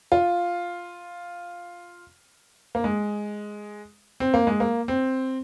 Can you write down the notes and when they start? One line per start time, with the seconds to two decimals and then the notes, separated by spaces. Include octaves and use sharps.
0.12 F4
2.75 A#3
2.84 G#3
4.20 C4
4.34 A#3
4.47 G#3
4.60 A#3
4.88 C4